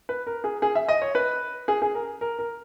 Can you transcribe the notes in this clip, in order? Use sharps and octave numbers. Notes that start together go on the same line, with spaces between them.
B4
A#4
G#4
G#4
E5
D#5
C#5
B4
G#4
G#4
A#4
A#4
A#4